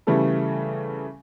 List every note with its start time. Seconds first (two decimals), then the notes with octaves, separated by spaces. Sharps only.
0.07 C#3 E3 G3 A3 A4